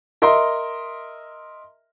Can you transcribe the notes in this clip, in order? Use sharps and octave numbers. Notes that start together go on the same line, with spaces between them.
A#4 D#5 E5 C6